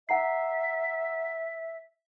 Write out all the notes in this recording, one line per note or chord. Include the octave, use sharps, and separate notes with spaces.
E5 F#5 A#5 C7